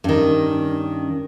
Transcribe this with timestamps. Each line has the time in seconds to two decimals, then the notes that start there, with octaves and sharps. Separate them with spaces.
0.04 G2 D#3 C#4